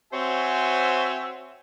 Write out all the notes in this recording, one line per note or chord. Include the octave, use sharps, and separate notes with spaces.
C4 F#4 C5 C#5 E5 G#5